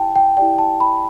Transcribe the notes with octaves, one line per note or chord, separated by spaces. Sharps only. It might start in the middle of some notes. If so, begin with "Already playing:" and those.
Already playing: E4 G4 D5 G5 A5
G5
E4 G4 D5 G5
A5
B5